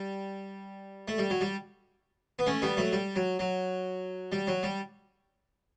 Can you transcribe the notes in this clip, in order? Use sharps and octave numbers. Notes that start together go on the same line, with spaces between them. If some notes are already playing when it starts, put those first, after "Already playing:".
Already playing: G3
A3
G3
F#3
G3
B3
A3 C#4
G3 B3
F#3 A3
G3
F#3
F#3
G3
F#3
G3